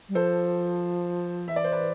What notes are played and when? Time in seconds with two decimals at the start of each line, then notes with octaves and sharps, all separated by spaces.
0.09 G3
0.15 F3 A4 C5
1.48 E3 E5
1.56 D5
1.64 C5
1.72 B4 D5